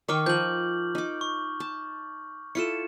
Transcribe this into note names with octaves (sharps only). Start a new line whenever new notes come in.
D#3 D#4 G5 C#6 D6 F6
F3 A#4 G6 F#7
D#4 D6
C#6
A5
E4 F4 A4 C#7 E7